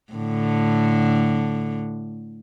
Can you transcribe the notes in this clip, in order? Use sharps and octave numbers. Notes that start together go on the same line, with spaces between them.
A2 D3